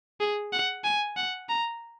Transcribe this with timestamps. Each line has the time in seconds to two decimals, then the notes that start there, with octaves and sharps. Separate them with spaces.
0.20 G#4
0.53 F#5
0.84 G#5
1.16 F#5
1.49 A#5